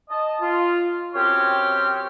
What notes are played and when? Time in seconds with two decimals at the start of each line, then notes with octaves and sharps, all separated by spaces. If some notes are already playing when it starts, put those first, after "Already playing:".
0.10 D#5 A5
0.40 F4
1.15 F#2 C4 G4 C#5 G5 F6